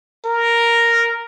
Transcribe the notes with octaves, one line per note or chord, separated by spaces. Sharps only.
A#4